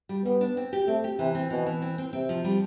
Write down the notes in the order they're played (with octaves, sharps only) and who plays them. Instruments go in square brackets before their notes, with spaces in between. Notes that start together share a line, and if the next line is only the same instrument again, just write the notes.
[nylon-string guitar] G3
[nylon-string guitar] G3 [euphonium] B3
[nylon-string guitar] D4
C4
G4
[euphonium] A3 [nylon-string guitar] C4
[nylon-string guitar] G4
[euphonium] C3 [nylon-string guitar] E3
[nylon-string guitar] C4
[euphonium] B2 [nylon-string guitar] E3
[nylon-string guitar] E3
C4
C4
[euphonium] C3 [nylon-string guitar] C4
[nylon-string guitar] F3
G3